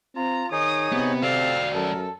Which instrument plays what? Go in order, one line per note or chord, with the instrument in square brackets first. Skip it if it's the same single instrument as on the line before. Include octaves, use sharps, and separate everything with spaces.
[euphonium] C4 [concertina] F4 [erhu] A#5
[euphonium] D#3 [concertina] D#4 G#4 C#5 [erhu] D#6
[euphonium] C3 [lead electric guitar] B3
[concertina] C4 A4 A5 [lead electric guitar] F#4 D5 [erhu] F5
[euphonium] F#2 [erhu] A4 [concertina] A#4